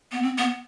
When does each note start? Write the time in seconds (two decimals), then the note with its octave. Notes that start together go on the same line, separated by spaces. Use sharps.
0.12 B3
0.22 C4
0.38 B3